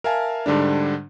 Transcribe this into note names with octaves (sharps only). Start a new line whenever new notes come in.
A#4 E5 F5 G#5 A5
G#2 D3 G3 D4